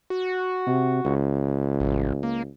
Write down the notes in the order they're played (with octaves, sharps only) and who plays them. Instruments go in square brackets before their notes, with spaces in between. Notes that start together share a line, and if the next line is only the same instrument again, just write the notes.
[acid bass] F#4
[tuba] C3
C#2
[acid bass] A1
A#3